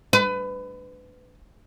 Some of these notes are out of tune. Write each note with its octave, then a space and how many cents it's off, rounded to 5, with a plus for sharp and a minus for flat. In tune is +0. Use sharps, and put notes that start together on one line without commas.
B4 +25